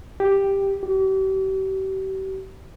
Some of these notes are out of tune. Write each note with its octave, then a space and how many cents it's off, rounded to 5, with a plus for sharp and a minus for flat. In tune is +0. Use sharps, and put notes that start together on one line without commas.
G4 +5
G4 -40